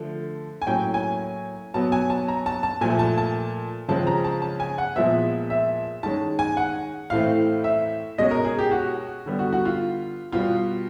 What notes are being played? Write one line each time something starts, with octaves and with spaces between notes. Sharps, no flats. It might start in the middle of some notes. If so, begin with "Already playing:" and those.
Already playing: D3 F3 A3
G#5
A2 F#3 A#3 C#4 G5
G#5
B2 F#3 B3 A5
G#5
A5
A#5
A5
A5
A#2 F3 A3 G#5
A5
A5
C#3 F3 G#3 C4 A5
A#5
A5
A5
G#5
F#5
A#2 F3 G#3 B3 E5
E5
D#3 G#3 C#4 A5
G#5
F#5
A2 E3 A3 C4 F5
E5
B2 G#3 C#4 D#5
A#4
G#4
G4
F#4
D3 G3 B3
F#4
F#4
F4
B2 G3 B3 F4